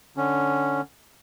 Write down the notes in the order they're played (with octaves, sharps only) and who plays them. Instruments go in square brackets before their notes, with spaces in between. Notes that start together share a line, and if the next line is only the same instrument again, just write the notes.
[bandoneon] D3 C#4